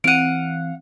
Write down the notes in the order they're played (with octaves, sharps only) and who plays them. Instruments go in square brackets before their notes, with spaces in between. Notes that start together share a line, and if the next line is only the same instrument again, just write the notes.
[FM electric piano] E3 C4 [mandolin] F5 F#5 [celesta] D7 D#7